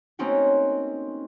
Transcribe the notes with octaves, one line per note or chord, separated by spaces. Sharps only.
A3 A#3 C4 C#4 D#4 F#4